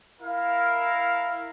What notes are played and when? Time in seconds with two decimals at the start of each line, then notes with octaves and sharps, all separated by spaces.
0.21 E4 A#4 F5